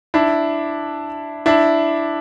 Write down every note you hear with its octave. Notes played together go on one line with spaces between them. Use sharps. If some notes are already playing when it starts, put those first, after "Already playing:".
D4 E4
D4 E4